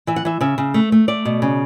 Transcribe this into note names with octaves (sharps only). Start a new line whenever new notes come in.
E3 E5
F#5
E3 E5
C#3 E5
C#3
A3
A3
A3 D5
B2
C#3